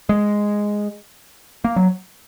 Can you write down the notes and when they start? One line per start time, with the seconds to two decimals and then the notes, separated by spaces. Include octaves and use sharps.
0.09 G#3
1.64 A#3
1.76 F#3